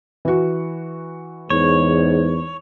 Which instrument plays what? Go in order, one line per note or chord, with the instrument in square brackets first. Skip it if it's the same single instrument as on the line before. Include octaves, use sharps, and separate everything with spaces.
[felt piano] E3 F#4
[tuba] E2 [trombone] G#2 [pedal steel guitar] C#5